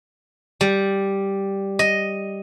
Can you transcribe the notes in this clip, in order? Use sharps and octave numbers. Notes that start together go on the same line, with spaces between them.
G3
D#5